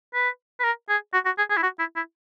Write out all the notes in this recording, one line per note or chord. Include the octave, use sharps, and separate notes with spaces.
B4
B4
A#4
G#4
F#4
F#4
G#4
G#4
E4
F#4
E4
E4